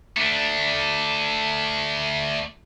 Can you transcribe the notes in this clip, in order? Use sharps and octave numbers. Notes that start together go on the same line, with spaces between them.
A3 D4